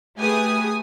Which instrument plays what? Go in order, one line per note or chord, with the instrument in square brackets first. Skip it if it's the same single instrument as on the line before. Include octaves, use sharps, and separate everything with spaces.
[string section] A3 G#5 D#6 [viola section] G4 G#4 B4